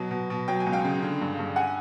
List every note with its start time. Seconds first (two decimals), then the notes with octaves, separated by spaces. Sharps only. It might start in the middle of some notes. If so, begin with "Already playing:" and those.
Already playing: B2 F#3
0.11 B2
0.30 B2
0.48 F#3 G5
0.60 G#5
0.66 C#2
0.73 F5 G5
0.85 C#3
1.03 D3
1.21 G2
1.39 G2
1.56 F#5 G#5